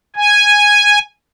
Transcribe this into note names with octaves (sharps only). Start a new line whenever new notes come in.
G#5